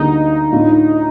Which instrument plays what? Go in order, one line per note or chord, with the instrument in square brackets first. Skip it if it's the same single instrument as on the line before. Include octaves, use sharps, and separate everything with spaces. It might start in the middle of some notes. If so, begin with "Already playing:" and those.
Already playing: [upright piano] D2 D3 G3 A#3 D4 [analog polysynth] D#4
[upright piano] A2 A3 D4 F4